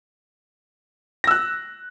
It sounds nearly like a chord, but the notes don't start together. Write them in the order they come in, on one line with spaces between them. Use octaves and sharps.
A#6 E6 F#6